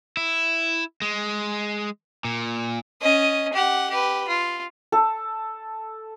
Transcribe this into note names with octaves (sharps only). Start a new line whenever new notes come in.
E4
G#3
A#2
C#4 D#5
G4 F#5
G4 B4
F4
A4